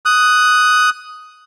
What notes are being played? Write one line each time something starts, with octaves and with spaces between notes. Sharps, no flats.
D#6 F#6